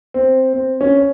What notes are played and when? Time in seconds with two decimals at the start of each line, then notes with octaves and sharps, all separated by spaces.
0.14 C4
0.53 C4
0.81 C#4
0.97 C#5